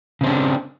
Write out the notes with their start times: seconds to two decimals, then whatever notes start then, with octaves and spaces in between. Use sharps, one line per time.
0.21 C#3
0.24 C4
0.26 D4